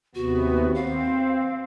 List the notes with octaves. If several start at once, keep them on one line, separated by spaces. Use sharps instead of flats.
D#2 C3 B3 F#4
C4 F5